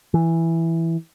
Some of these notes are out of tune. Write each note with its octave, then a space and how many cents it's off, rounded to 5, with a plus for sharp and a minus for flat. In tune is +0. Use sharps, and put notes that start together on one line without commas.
E3 +0